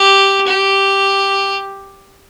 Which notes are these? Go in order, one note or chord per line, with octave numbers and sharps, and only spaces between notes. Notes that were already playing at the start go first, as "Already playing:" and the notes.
Already playing: G4
G4